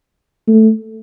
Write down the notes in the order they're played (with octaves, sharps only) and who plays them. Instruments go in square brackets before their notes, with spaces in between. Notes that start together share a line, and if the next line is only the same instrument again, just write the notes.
[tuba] A3